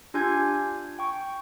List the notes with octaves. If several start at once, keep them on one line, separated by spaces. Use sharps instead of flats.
D4 F4 G4 G#5 G6 G#6
G5 C#6